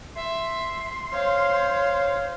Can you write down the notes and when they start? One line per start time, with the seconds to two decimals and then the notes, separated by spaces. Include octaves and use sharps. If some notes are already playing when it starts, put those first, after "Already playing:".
0.16 E5 C6
1.12 C5 C#5 F5